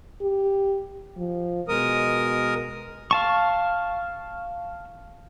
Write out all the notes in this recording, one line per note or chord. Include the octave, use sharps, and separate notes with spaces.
G4
F3
B2 G#3 A#4 D#6
F5 A5 C#6